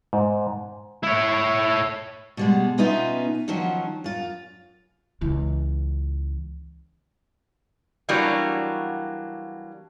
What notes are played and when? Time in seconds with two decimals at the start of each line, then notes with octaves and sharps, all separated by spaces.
0.13 G#2
1.03 E4 C#5
2.37 B2 G3 G#3
2.78 B2 B3 C#4 D#4 F4 E5
3.48 D#3 F3 F#3 C#4
4.04 F#2 F4
5.21 C#2 E3
8.09 E3 F#3 G3 A#3 D4 F#4